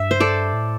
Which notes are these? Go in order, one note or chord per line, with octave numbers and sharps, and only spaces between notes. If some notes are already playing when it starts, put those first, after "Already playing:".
Already playing: G2 E5
C5
A4 D5
A2